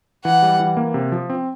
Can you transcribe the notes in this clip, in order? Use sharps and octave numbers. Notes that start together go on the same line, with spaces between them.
E3 F#5
G3
E3
A#3
C3
F3
C4